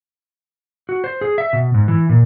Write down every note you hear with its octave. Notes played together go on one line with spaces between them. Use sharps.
F#4
C5
G#4
E5
B2
G#2
E3
A#2